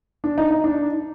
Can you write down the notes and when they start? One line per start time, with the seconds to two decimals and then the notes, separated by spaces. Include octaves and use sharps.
0.24 D4
0.38 D#4
0.51 D#4
0.64 D4